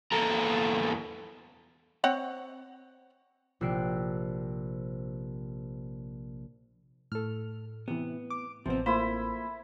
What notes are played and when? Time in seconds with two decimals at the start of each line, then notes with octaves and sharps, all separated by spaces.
0.12 E2 A#3 A4 A#5
2.04 C4 C#5 F#5
3.61 A#1 C3 E6 F#6 C7 D7
7.12 A2 A4 F6
7.88 C3 E3 B3
8.30 D6
8.66 A1 C3 F3 B3 C4
8.86 A3 A#3 E4 F4 C5 B5